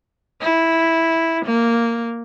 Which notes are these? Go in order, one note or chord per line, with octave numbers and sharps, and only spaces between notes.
E4
A#3